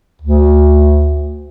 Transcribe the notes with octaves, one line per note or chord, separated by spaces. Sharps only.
D2